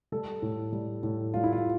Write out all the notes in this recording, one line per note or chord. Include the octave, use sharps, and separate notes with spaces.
G3 A4
A2
G3
A2
G3 F4
E4
F4